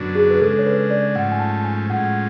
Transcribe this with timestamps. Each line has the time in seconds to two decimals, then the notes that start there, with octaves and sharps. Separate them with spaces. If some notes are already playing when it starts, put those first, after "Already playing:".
Already playing: F#2 D3 F#3 B3 D4
0.15 G#4
0.30 B4
0.41 C#3 G#3 D4 A4
0.59 C#5
0.66 B4
0.90 D5
1.14 G#2 F3 A3 C#4 F#5
1.32 G#5
1.40 A5
1.64 G#5
1.89 A2 F3 G#3 C#4 F#5